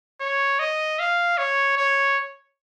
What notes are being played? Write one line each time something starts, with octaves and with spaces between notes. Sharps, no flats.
C#5
D#5
F5
C#5
C#5